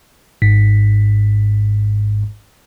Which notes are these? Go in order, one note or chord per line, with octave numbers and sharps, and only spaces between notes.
G#1 G#2 B6